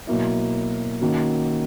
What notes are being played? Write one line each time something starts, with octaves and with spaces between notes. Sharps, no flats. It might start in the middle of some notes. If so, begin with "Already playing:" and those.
B2 F#3 A#3 E4
D#3 A#3 C#4 F#4